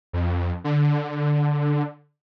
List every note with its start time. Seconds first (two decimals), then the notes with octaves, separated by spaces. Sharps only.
0.13 F2
0.64 D3